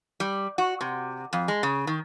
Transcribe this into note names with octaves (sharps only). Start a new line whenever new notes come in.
G3
F#4
C3
F2
G#3
C#3
D#3